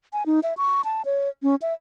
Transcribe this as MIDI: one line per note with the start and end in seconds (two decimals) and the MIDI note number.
0.13 0.23 80
0.26 0.40 63
0.43 0.54 76
0.57 0.82 85
0.85 1.02 81
1.05 1.29 73
1.43 1.55 61
1.62 1.73 76